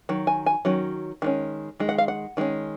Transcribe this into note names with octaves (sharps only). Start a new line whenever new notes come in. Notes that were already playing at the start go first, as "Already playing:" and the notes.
D#3 F#3
G#5
G#5
D#3 F#3 C#4
D#3 G#3 C#4
D#3 G#3
F#5
F5
F#5
D#3 G#3 C#4